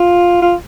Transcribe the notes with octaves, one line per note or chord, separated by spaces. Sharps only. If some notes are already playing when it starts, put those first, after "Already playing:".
Already playing: F4
F4